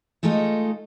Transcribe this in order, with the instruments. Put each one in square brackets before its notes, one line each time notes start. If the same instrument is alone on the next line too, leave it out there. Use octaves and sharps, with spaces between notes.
[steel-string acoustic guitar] G#3 A3 D#4 F4 A4 D#5